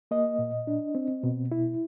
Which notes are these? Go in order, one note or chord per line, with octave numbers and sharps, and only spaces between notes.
A#3 D#5
A#2
D4
C4
B2
E4